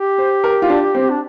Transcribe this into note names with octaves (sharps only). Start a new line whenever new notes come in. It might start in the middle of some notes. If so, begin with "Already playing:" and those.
Already playing: G4
C5
A#4
F4
D4
C4
D4